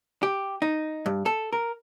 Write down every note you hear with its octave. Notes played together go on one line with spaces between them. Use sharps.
G4
D#4
G2
A4
A#4